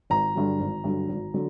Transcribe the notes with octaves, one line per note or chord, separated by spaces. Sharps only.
G#1 A#5
G2 D3 F#3
G#1
G2 D3 F#3
G#1
D3 F#3